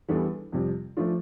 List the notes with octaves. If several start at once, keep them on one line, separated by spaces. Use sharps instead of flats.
E2 E3 G3 D4 A4
F2 C3 G3
F3 A3 D4 F4